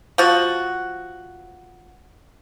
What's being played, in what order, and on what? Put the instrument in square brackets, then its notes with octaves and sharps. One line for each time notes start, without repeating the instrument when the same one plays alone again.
[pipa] F3 F#4